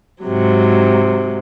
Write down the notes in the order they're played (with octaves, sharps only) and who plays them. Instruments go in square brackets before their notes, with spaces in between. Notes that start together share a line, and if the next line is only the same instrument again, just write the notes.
[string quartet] G#2 C3 F#3